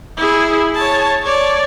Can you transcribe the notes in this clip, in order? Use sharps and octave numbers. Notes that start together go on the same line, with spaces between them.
E4 G#4
C#5 A5
C#5 D5